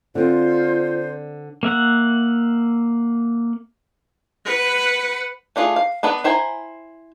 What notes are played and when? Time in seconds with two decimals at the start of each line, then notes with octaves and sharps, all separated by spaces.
0.15 D3 C4 F4 C5
1.63 A#3 E5 F#5
4.45 B4 F#5
5.56 A3 D4 F4 G#4
5.76 F5
6.03 B3 D4 B4 F#5
6.24 E4 C5 G5 G#5 A#5